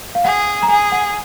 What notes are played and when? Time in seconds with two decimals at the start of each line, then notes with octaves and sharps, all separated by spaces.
0.15 F5
0.24 G#4 F#5
0.63 A#5
0.68 G#4 G#5
0.92 F#5